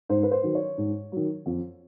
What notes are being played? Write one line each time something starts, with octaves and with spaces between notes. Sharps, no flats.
G#2 C5
B4
C5
D#3 F#3
C#5
G#2
D#3 F#3
F2